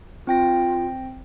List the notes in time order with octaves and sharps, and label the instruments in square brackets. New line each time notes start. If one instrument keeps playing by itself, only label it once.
[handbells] C4 G5 A#6 [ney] F4